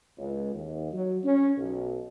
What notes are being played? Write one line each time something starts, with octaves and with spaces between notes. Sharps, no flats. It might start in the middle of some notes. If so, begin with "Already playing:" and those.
C#2
D#2
F#3
C#4
B1